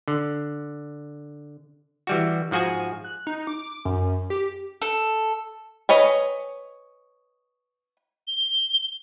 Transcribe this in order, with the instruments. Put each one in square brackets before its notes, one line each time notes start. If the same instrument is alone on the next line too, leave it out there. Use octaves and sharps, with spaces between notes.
[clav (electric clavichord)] D3
E3 G3 F#4
G#2 F3 F#4 G#4 G#5
[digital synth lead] F#6
D#4
D6
F#2
G4
[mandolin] A4
[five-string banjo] B4 C#5 D#5 G#5
[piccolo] G7